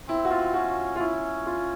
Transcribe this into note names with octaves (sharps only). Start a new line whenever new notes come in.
C4 E4
F#4
F4
C#4 F#4
F4
C#4 E4
F4